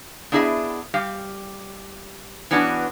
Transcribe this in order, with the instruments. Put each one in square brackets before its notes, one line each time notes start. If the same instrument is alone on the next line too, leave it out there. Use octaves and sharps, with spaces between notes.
[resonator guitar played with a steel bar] B3 D4 E4 G#4 D#5 E5
G3 G4 F5
E3 B3 C#4 D4 F#4